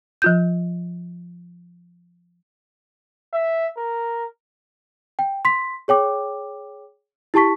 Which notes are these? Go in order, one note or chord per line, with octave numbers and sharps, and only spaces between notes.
F3 F4 G6
E5
A#4
G5
C6 B6
G#4 C#5 G5 D6
E4 G4 A5 C#6 B6